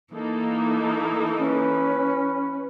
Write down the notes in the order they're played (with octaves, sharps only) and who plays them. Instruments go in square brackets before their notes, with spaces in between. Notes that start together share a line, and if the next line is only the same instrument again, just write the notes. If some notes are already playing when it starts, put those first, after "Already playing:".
[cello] E3 [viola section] A#3 D#4 A4
[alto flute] C#4 [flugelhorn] B4